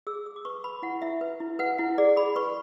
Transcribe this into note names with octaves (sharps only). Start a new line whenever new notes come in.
G#4 E6
G#4 E6
D6
B4 C#6
B4 B5
E4 F#5
E4 E5
B4
E4
B4 F#5
E4 F#5
G#4 D5
G#4 B5
B4 C#6